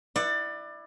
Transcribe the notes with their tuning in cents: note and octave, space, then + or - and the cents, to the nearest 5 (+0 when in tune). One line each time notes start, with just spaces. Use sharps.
E4 +0 D5 +25 F#5 +0